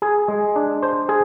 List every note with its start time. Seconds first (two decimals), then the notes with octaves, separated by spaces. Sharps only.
0.02 G#4
0.28 G#3
0.56 D4
0.82 C5
1.09 G#4